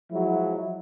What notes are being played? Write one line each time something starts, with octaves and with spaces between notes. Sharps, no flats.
F3 F#3 G#3 E4